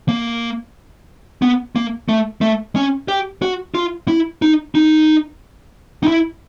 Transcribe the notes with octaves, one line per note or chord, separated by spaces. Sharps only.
A#3
B3
A#3
A3
A3
C#4
G4
F#4
F4
E4
D#4
D#4
D#4
E4